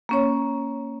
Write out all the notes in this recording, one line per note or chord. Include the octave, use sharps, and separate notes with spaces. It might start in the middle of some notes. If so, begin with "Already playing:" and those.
A#3 C#4 C#5